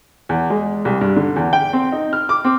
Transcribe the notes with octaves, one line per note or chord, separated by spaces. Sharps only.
E2
G#3
C2
G2
D3
E2
G5
C4
D#4
F6
D6
C4